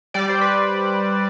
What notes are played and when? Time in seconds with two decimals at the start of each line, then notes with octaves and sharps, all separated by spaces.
0.14 G3 D5
0.29 C5
0.41 B4